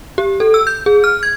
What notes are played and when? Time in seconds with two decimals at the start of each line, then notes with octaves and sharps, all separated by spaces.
0.18 G4
0.40 A4
0.54 E6
0.67 G6
0.86 G#4
1.04 F6
1.23 G#6